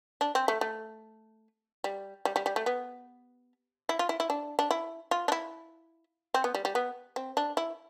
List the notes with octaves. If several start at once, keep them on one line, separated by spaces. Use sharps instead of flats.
D4
C4
A3
A3
G3
G3
G3
G3
A3
B3
E4
F4
E4
E4
D4
D4
E4
F4
D4
E4
C4
B3
G3
G3
B3
C4
D4
E4